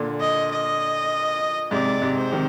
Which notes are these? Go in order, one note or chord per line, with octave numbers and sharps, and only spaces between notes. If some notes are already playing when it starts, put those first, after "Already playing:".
Already playing: A#2 D3
D#5
D#5
G#2 C3 D5
G#2 C3
C5
C3 D#3